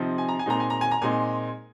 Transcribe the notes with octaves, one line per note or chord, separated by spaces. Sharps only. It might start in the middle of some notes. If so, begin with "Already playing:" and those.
Already playing: C3 F3 C4 D#4
G#5
A#5
G#5
A#2 G#3 C4 D#4 A#5
G#5
A#5
G#5
A#5
A#2 G#3 C4 D#4 G#5